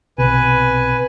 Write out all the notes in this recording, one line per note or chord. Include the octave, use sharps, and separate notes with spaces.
B1 C3 B4 G#5